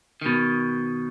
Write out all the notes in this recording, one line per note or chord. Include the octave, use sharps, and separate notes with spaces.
B2 D#3